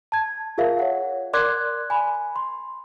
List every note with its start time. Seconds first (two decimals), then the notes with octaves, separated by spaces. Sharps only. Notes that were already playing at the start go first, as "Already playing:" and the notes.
0.12 A5 G#6
0.58 F4 G#4 A#4 E5 F5
0.79 C#5 F#5
1.33 A#4 D5 C6 D6 F#6 G#6
1.90 G#5 B5
2.36 C6